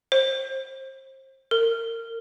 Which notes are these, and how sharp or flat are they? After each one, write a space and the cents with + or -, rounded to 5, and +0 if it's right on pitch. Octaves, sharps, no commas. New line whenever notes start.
C5 +25
A#4 -30